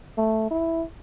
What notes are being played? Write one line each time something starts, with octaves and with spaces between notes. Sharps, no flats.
A3
E4